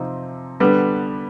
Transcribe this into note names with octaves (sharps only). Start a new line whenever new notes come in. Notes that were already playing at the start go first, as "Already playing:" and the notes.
Already playing: C3 F3 C4 D#4
D3 G3 B3